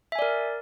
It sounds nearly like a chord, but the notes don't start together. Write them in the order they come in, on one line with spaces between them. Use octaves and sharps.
E5 G#5 D5 A#4